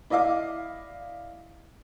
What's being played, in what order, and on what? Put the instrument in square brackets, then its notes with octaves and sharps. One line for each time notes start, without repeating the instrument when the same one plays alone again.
[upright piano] E4 D5 D#5 F5 D6